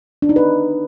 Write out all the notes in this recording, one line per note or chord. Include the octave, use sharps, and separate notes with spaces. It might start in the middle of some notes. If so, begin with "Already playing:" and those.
D4
D#4
B4